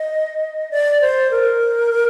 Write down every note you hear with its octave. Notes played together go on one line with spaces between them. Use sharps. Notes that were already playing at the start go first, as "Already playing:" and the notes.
Already playing: D#5
D5
C5
A#4